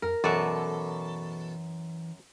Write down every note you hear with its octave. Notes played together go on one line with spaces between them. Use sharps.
F2 A#4
F#2 B2 E3 A4 D5 F#5